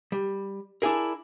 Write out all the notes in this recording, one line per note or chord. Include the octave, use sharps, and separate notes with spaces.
G3
D4 E4 G#4 A#4